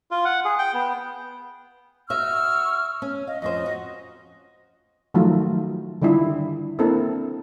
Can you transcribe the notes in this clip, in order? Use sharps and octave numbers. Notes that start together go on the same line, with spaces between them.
F4
F#5
G#4
G5
B3
F#4 D#5 E5 C#6 E6 F6
C#4
D#5 F5
F2 C#4 C5 D#5
F#4
D#3 F3 F#3 A3 D#4 F4
D3 D#3 G3 D4 E4 F4
A#3 C4 D4 E4 A4 A#4